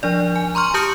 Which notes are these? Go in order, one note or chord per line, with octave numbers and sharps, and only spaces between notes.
F3 D4 D5
G#5
A#5 C6 C#6 F6
G4 A5 D#6 G6 C#7 F#7